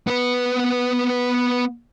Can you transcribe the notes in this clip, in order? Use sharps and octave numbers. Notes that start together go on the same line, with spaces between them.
B3 B4